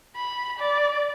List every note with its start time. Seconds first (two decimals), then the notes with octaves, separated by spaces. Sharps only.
0.17 B5
0.59 D5